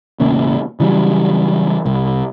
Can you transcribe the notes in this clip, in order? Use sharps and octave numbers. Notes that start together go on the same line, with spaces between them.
E1 A1 C#3 A#3
C#3 E3 F#3 G3
C2